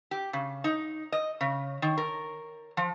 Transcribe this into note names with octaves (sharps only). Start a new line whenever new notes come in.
G4
C#3
D#4
D#5
C#3
D#3
A#4
F3